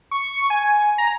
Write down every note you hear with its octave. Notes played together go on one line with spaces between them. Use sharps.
C#6
G#5
A#5